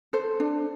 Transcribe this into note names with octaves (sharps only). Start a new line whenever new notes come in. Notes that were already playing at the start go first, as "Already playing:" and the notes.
A4 C5
D4